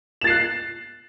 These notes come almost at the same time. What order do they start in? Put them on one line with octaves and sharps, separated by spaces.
E7 A6 C7 F#6